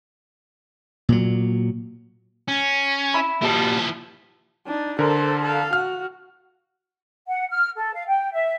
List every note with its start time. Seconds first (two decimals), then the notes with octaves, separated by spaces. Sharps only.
1.09 A#2 F#3
2.48 C#4
3.14 E5 B5
3.42 A#2 F3 E4 G4 A5
4.67 D4 D#4
4.99 D3 A4 A#4 C5
5.42 A4 F5
5.73 F#4 F6
7.27 F#5
7.50 F6
7.75 A4
7.94 F5
8.07 G5
8.31 E5